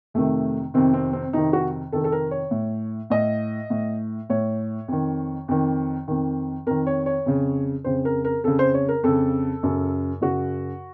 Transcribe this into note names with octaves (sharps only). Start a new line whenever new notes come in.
F2 C3 D#3 A3
F2 C3 D#3 C4
C4
C4
F2 C3 D#3 D#4
F#4
F2 C3 D#3 A4
A4
A#4
C#5
A2
A2 D#5
A2
A2 C#5
F2 D#3
F2 D#3
F2 D#3
F2 D#3 A#4
C#5
C#5
F2 C#3
F2 C#3 C5
A#4
A#4
F2 C#3 A4
C5
C#5
A#4
F2 C#3 A4
F#2 C#3
F#2 C#3 F#4